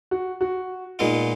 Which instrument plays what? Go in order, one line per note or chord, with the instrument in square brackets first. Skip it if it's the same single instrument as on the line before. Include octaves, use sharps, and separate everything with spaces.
[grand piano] F#4
F#4
[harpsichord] A#2 G#3 B3 F4 [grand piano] D#4